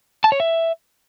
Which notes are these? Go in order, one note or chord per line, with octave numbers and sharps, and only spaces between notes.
A5
C#5
E5